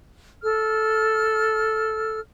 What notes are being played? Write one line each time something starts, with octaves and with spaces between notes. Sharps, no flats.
A4 F6